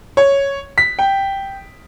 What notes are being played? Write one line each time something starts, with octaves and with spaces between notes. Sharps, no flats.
C#5
B6
G5